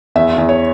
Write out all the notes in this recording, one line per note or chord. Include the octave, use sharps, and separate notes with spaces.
E2 E5
E2
C#5